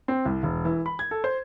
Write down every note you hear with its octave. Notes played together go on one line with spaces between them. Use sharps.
C4
C2
E1
E3
B5
G#6
A4
C5